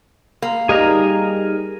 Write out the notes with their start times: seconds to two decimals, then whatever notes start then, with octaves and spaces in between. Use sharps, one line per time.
0.42 A#3
0.69 G3 D#4 G4 G#4 A#4 A#5